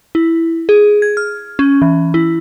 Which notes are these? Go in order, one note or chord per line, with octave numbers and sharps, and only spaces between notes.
E4
G#4
G#6
F6
C#4
E3
E4